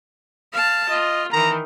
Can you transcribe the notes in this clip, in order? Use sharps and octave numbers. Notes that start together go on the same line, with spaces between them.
F5 A5
F4 D#5
D#3 E3 A#5